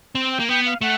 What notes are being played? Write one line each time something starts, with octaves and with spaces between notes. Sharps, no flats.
C4
G5
A#3
B3 G5
F5
A3 F#5